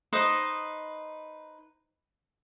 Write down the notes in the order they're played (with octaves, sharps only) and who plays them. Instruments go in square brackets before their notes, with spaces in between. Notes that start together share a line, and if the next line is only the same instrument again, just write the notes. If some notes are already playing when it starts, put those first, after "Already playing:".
[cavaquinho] D#4 B4 C5 D#6